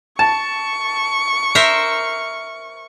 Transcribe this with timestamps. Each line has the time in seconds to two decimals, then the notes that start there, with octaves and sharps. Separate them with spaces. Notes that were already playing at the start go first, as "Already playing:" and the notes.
0.19 A5 C#6
1.55 A#4 C5 E5